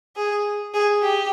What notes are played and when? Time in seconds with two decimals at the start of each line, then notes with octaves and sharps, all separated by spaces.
0.16 G#4
0.74 G#4
1.02 G4